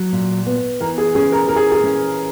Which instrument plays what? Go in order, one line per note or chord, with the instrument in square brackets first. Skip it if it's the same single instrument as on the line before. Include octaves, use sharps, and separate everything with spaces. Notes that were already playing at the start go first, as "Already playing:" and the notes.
Already playing: [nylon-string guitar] F#3
A#2
B3
[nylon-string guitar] E3 [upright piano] A#4
[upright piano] G#4
[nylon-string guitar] C#4 [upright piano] G#4
[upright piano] A#4
[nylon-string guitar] E3 [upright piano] A#4
[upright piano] G#4
G#4
[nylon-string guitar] C#4